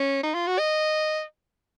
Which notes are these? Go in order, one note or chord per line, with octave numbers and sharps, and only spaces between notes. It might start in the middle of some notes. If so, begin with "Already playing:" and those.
Already playing: C#4
D#4
F4
F#4
D#5